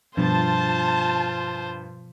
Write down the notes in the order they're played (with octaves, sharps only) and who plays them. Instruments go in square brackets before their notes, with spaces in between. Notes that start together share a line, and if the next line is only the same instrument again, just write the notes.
[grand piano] G2 [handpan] B2 F3 [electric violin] F4 C5 [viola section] A5